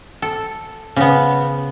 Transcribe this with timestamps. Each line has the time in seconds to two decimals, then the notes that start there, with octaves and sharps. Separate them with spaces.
0.22 A4
0.96 C#3 B3